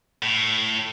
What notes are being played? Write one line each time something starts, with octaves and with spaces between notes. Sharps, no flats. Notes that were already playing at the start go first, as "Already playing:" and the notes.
A2